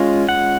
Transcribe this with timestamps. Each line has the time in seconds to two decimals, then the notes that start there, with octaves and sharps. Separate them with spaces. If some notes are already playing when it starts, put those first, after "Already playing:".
Already playing: G#3 C#4 F4
0.29 F#5